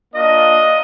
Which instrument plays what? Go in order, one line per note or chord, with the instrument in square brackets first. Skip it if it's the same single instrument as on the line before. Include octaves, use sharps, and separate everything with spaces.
[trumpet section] A#3 D4 F4 D#5